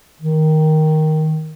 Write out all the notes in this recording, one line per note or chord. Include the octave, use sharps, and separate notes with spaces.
D#3